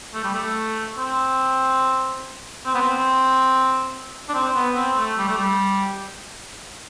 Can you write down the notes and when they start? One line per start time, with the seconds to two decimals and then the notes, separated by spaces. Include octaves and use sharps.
0.14 A3
0.24 G3
0.34 A3
0.98 C4
2.66 C4
2.74 B3
2.82 C4
4.29 D4
4.34 C4
4.56 B3
4.76 C4
4.97 A3
5.18 G3
5.28 A3
5.36 G3